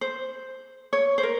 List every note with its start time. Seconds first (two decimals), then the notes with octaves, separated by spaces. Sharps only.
0.01 C5
0.93 C#5
1.18 C5
1.23 A#4